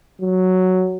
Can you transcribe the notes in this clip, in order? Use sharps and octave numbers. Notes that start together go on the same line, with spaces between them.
F#3